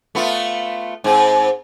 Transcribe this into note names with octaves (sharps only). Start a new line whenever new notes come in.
A3 B3 F4
G#2 C4